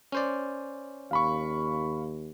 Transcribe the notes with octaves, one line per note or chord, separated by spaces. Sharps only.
C#4 C5 D5
D#2 F5 B5 C#6